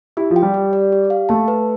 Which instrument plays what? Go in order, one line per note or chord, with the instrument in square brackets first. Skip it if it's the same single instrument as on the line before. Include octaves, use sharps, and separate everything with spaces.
[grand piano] E4 [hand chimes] G4
[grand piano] F3
[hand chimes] G5
[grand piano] G3
[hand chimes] G4
D5
G4
F5
[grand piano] A3 [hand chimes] A5
[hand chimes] B4